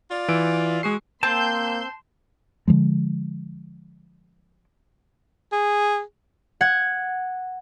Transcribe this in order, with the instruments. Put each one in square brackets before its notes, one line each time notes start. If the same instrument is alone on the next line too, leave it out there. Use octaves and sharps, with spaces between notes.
[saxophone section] F4 D5
[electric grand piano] E3 E6 D7
[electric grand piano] G#3 C7 [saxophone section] F#4 G#4
[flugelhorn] A#3 [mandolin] C4 [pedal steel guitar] A5 [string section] C6 G6
[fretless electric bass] D3 E3 F3 G#3
[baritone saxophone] G#4
[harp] F#5 G#6